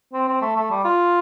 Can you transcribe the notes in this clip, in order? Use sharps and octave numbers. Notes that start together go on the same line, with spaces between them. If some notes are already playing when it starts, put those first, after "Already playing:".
C4
C4
A3
A3
G3
F4